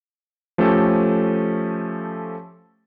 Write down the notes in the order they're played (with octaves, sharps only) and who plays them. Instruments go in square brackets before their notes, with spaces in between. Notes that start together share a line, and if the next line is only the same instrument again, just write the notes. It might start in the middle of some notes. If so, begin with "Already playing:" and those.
[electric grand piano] F3 A3 C#4 G4 A4